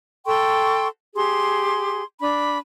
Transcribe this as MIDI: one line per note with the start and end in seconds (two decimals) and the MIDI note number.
0.26 0.87 69
0.26 0.87 79
0.26 0.87 84
0.26 0.87 85
1.15 2.02 67
1.15 2.02 68
1.15 2.02 84
2.21 2.58 62
2.21 2.58 83